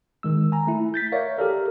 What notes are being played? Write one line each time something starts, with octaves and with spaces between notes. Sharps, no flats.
D#3 G#3 E6
G#5 A#5
A3 E4
G6 A6 B6
A#4 C#5 D5 E5 F5
G4 A4 A#4